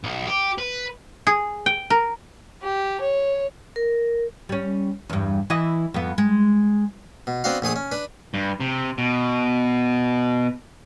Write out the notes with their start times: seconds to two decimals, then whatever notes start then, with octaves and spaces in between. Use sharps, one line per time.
0.04 B1
0.27 G4
0.58 B4
1.27 G#4
1.66 G5
1.90 A#4
2.62 G4
3.01 C#5
3.76 A#4
4.49 G3 C#4
5.09 E2 G2
5.50 E3 E4 D#5
5.94 F2 B3
6.18 G#3
7.27 B2
7.44 B3 C4 D4 F#4 F5
7.62 A#1 A3 G#4 D#6
7.76 C#4
7.92 D4 B4
8.34 G2
8.60 C3
8.98 B2